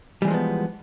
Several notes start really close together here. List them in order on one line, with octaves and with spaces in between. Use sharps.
G3 E3 G#3 F3 B3